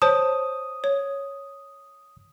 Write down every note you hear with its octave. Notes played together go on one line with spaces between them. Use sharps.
C5 C#5 A5 D#6
C#5